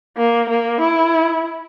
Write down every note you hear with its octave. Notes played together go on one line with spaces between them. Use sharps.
A#3
A#3
E4